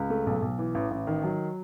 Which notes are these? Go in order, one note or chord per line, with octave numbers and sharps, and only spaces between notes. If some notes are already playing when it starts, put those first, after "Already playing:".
Already playing: C#2
A3
B1
B1
E3
A1
A1
D#3
F#3